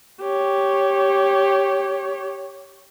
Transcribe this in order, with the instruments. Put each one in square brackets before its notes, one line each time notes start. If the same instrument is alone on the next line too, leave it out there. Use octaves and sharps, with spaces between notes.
[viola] G4 C#5